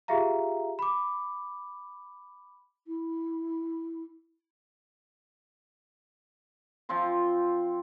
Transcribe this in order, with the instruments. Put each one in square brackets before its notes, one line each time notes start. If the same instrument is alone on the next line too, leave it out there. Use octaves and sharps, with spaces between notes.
[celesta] F4 G4 G#4 E5 F5 A#5
B5 D6
[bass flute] E4
[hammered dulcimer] F3 C4 F4 C6